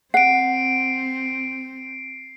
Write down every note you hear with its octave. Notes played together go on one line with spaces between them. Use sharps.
C4 F#5 C7 D7